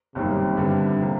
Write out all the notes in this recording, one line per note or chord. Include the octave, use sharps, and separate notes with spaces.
G1 F#2 C3 D#3 G3 A#3
G2 D3 G3 B3
C3 F3 A#3